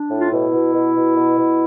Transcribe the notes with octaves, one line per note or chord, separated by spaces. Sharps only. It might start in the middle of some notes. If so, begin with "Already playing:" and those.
Already playing: D4
A2
F4
B2 E4
B2
B2
B2
B2
B2